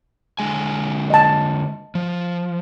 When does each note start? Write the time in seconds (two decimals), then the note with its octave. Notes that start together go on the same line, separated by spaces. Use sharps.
0.39 D3 G#3 G#5
1.10 D#5 A5
1.95 F3